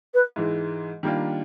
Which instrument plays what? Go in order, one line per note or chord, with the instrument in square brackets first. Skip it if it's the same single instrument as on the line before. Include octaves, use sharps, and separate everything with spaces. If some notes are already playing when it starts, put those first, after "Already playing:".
[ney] B4
[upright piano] G#2 E3 G#3
D#3 G3 A#3 D4 F4